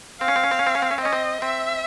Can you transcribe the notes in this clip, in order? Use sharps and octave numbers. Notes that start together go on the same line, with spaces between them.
C4 F5
C#4
C4
C#4
C4
C#4
C4
C#4
C4
C#4
C4
C#4 D#5
C4
C4 E5